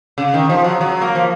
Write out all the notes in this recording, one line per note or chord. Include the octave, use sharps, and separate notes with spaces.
C#3
D#3
F3
F#3
F#3
A#3
F3